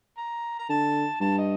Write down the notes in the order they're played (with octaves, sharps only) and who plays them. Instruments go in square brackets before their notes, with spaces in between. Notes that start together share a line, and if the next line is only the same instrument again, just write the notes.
[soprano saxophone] A#5
A#5
[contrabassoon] D3 [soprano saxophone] A5
[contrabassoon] G2 [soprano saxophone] A5
[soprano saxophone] D#5